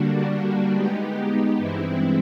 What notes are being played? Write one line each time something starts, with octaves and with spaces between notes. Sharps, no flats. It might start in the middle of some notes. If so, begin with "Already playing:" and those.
Already playing: D3 G3 A#3 D4 F#4
G#3 B3 D#4 G4
G2 E3 G#3 C4 E4